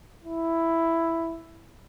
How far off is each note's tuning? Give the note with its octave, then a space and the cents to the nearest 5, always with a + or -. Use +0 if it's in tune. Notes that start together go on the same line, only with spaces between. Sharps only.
E4 +5